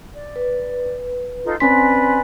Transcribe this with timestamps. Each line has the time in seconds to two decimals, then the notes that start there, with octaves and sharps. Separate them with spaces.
0.14 D5
0.36 B4
1.44 D#4 F4 A4
1.60 C4 C#4 B4 D5 G#5 C6 B6